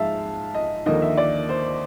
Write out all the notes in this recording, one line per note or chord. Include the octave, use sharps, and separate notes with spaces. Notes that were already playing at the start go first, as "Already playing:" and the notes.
Already playing: G#2 F3 G#3 E5 F5 A5
D#5
D#2 D3 F3 A#3 D#5
E5
D5
C5